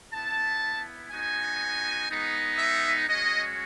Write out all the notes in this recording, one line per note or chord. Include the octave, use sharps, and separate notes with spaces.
B3 E4 A5
B3 D#4 F#4 G#5
G#3 B3 D#4
E5
G#3 C#4 F#4 D#5